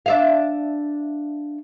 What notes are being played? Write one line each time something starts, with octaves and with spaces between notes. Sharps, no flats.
D4 E5 F5